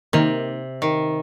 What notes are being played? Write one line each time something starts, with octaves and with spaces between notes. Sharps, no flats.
C3 D#3 A#3 D#4 A#4
D#3